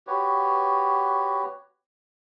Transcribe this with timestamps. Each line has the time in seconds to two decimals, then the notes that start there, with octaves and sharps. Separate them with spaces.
0.07 F#4 G4 B4 C#5